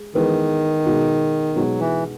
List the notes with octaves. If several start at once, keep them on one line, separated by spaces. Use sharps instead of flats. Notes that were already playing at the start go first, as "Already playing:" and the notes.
Already playing: G#3
D#3 E3 G#3 B3
B2 G#3 D#4 F#4
B2 F#3 G#3 D#4 F#4
E3